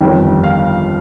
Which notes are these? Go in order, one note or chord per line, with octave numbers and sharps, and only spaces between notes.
G1 F2 D#3 G3 G5
F5